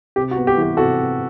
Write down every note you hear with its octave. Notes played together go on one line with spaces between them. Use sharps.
C3 G4
F#4
B3
G4
E3
G4
C3 F#4 A4
C3